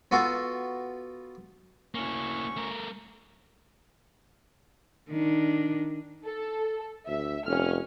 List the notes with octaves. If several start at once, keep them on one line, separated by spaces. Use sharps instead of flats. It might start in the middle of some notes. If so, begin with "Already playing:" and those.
B3 F4 F#4 A4
D2 A#3 C#4 E4 C#6
A3 A#4
D#3 D4
A4
D2 E5
F1 C#4 F6